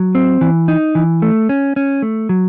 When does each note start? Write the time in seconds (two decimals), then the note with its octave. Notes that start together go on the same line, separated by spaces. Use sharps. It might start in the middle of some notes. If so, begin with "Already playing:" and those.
Already playing: F#3
0.15 C4
0.41 E3
0.68 D#4
0.95 E3
1.22 A3
1.49 C#4
1.76 C#4
2.02 A3
2.29 F#3